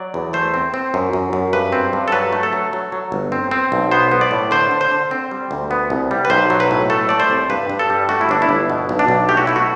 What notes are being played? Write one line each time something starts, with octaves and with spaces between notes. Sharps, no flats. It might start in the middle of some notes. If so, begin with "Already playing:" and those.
Already playing: F#3 D5
E2
A3 C5
C4
C4
F#2
F#2
F#2
G2 B4
C4
G2
A4
F#3 B4
A3
A4
F#3
F#3
F#3
G1
C4
C4
B1
B3 C5
B3
D5
A2
D3 C5
D3
C5
D3
C4
G3
D2
B3
C2
G3
B4
B1 C5
F#3
B4
A2
A3 A4
A3 D5
C5
C2
G2 B4
G2
A4
G3
A3 F#4
E4
G1 D4
E4
G1
B2
B1
D4
B1
A3 G4
F#4
A3 E4
F#4